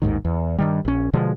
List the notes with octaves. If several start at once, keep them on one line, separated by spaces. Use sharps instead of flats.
A1 D#2 G#2 D#3
E2
G2 D#3 G3
A#1 C#4
B2 D3 F3 G#3